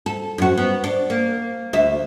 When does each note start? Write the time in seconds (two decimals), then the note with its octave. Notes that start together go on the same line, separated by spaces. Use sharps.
0.06 A4
0.38 F#2 F#4
0.58 B3
0.84 D4
1.10 A#3
1.73 D2 E5